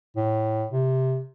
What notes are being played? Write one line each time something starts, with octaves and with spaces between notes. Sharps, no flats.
A2
C3